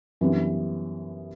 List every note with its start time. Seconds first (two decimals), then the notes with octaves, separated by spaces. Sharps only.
0.21 F#2 E3 G3 B3 D4